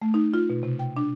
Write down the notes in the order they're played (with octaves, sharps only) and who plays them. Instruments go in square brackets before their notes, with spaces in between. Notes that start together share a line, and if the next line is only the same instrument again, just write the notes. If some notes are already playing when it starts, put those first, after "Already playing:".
[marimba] A3
D#4
F4
B2
C3
G5
D4